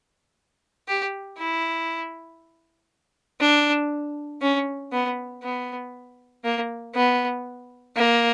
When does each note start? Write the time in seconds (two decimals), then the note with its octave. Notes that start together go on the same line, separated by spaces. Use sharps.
0.88 G4
1.38 E4
3.40 D4
4.42 C#4
4.92 B3
5.43 B3
6.44 A#3
6.95 B3
7.96 A#3